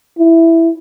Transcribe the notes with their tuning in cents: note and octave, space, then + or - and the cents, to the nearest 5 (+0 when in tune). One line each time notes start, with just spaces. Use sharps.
E4 +5